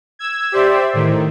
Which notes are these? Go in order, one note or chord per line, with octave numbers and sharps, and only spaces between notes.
E6 G#6
G4 C5 D5 E5
A2 D#3